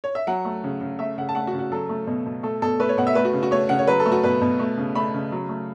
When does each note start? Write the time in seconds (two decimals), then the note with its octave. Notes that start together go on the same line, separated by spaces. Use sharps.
0.04 C#5
0.15 E5
0.27 F#3 F#5
0.45 A3
0.64 C#3
0.81 C#3
0.99 A3 E5
1.18 C#3 F#5
1.29 A5
1.35 A3 F#5
1.47 F#4
1.53 C#3
1.59 F#4
1.72 F#3 A4
1.89 A3
2.07 B2
2.26 B2
2.43 A3 A4
2.62 B2 A4
2.80 A3 B4
2.89 C#5
2.97 B2 F#5
3.07 E5
3.15 A3 B4
3.25 F#4
3.33 C#3
3.43 F#4
3.51 A3 C#5
3.69 C#3 F#5
3.79 C#5
3.87 F#3 B4
4.00 A4
4.06 A3
4.12 F#4
4.24 B2 B4
4.41 B2
4.59 A3
4.77 C#3
4.95 A3 B5
5.14 C#3
5.32 F#3
5.49 A3